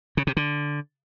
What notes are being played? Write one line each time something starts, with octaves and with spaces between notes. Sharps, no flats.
C#3
C3
D3